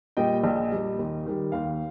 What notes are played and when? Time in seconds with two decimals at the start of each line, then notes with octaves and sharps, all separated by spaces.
0.17 A#2 G3 D#5 G5
0.44 A#1 D#5
0.72 A#2 G3
0.99 D#2
1.26 D#3 G3
1.52 D#2 F5